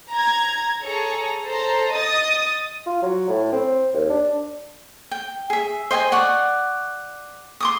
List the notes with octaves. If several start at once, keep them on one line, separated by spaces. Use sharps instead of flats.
A#5 G#6
G#4 A4 C#5 A#5
A4 C5 A#5
D#5 D#6 A6
F4
F#3
A2
C4
D#2
D4
G5
G#4 E5
C5 D#5 G5 G#5
D5 F#5 C#6
C6 D6 D#6